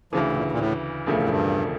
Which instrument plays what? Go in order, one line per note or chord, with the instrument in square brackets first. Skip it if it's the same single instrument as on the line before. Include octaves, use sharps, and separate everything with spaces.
[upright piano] D2 C#3 E3 [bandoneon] F3
[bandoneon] A2
A#2
A#2
A2
[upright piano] E1 D2 C#3 F3 A3
[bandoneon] A2
G2